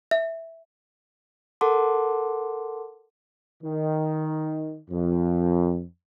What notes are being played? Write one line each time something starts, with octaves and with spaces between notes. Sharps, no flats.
E5
A4 A#4 F#5 A5 C6 D6
D#3
F2